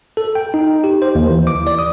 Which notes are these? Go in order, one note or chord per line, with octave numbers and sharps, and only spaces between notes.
A4
G5
D#4
G4
C5
D#2
E3
D6
D5
D#6